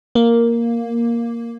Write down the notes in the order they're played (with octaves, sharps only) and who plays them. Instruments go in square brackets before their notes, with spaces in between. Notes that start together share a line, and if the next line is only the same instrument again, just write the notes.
[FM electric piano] A#3